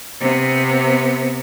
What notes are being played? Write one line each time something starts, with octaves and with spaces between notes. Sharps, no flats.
C3 B3